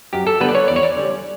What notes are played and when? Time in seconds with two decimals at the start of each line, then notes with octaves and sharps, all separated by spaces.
0.13 F#2 G4
0.27 A4
0.40 D3 G3 B3 D4 B4
0.49 D5
0.55 C#5
0.68 E2 D5
0.76 C#5
0.83 D5
0.96 D3 G3 C#4